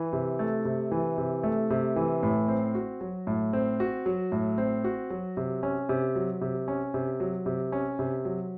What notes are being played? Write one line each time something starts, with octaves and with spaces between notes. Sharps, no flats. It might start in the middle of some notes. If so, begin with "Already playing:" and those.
Already playing: E3
C3
A3
C3
E3
C3
A3
C3
E3
A2
C4
F#4
F#3
A2
C4
F#4
F#3
A2
C4
F#4
F#3
C3
C#4
C3
F#3
C3
C#4
C3
F#3
C3
C#4
C3
F#3